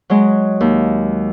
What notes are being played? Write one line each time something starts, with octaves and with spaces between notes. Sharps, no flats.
F#3 G#3
D#2